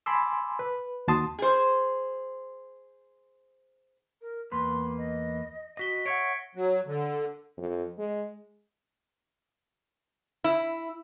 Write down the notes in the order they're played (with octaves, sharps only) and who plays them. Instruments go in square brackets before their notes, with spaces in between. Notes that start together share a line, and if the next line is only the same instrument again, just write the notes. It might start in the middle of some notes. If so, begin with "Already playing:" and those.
[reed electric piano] G#5 A5 B5 C6 D6 E6
B4
D#2 F#4 A5 C6 D#6
[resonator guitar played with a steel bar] G#4 C5
[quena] A#4
[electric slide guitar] E2 A#3 B4 [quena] C6
[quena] D#5
[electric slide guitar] F#4 D#5 [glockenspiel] A#6 B6 G7
[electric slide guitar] C#5 E5 F#5 [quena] C#6 [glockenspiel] G#6 C#7 D7
[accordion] F#3
D3
[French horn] F2
G#3
[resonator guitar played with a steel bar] E4